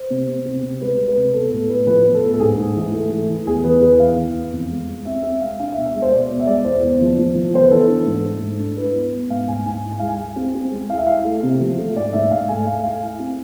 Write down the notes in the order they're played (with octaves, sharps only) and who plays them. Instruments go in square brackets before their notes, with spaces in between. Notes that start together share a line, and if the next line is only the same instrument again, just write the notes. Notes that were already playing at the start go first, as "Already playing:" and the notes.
Already playing: [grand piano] C5
C3
C3
C4
C3
G#3 B4
G#3
B4
C3
B3 A4
A2 A4
A2 B4
F3 B4
B3
A4
A2
A4
G#2 G#4
G#2
E3
A3
A3
E3
E2 G#4
E3 B4
E2 B4
E3 F5
E3
E2
F2
G#3
G#3
C4 E5
C4 E5
G#3 F5
D4 F5
B2 E5
E5
G#3
C5
B2 D5
B2
E5
G#3 D5
E2 C5
E2
F3
F3
F3
B3 C5
B4
E3 A4
D4
G#2
A3
G#2
D4
E4 B4
B3
B3
G#2 F5
G#2 G#5
G#2 G#5
E4
G#5
G#3 F5
G#5
G#3
C4
C4
G#3
E4 F5
E5
E4 F5
A3
C3
F3
A3
G#2 D5
G#2 E5
G#2 F5
A3 G#5
A3 F5
A3 F5
E4 G#5
C4